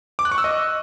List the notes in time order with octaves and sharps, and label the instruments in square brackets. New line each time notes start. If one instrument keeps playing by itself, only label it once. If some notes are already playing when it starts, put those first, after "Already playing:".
[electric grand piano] D6
F#6
C#6
E6
D#5